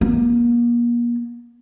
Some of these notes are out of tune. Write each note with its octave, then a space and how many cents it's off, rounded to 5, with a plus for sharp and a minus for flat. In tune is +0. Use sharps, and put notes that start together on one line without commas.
A#3 +35